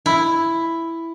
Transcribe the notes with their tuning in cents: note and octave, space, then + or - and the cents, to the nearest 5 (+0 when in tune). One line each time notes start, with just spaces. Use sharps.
E4 +5